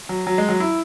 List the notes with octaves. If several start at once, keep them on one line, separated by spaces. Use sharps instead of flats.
F#3
F#3
G#3
F#3
E4